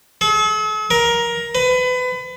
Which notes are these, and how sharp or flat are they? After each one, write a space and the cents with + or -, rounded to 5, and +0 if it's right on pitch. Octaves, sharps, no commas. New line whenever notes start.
A4 -45
A#4 +15
B4 +30